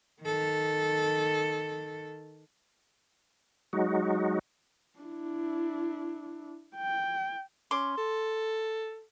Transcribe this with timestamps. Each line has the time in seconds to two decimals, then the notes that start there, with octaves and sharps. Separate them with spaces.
0.22 D#3 A4
3.73 F#3 G#3 D#4 F#4
4.99 D4 E4
6.76 G5
7.71 C#4 C6 D6
7.97 A4